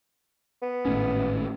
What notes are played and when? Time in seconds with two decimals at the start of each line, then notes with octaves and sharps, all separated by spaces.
0.62 B3
0.85 G#1 A2 C#4